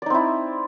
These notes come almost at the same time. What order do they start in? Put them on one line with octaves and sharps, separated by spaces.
D5 D#4 C4 E4